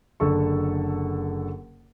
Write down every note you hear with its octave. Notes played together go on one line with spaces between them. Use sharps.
F#1 D3 A4 C#6